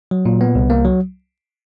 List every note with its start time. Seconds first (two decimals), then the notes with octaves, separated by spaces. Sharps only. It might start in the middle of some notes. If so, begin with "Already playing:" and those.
0.11 F#3
0.26 A#2
0.41 B3
0.55 C2
0.70 A#3
0.85 F#3